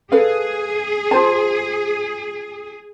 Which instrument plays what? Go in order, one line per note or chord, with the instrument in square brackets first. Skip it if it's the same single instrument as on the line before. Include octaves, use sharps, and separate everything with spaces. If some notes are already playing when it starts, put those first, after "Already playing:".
[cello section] G#4 [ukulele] A4 B4 F5
[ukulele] F4 C5 A5